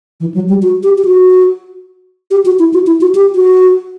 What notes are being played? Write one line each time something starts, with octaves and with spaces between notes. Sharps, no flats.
E3
F#3
G3
F#4
G4
G4
F#4
G4
F#4
E4
F#4
E4
F#4
G4
F#4